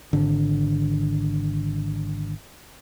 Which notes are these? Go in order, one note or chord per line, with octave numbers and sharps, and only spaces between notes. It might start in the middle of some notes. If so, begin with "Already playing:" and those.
G#1 D3